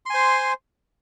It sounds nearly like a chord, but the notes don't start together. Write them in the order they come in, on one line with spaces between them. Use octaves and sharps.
C6 G#5 C5